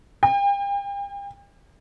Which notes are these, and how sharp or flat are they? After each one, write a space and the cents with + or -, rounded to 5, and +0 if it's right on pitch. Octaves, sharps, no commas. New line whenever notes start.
G5 +40